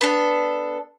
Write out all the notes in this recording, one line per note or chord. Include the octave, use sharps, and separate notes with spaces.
B3 D4 A4